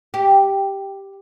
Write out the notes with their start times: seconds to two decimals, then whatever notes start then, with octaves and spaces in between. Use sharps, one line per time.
0.14 G4